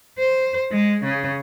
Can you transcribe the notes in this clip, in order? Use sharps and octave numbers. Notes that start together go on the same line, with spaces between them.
C5
G#3
C#3